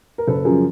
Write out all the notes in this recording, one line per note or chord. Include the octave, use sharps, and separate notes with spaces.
A#4
F#1 A4 B4
F#2 C#3 F3 G#4 A#4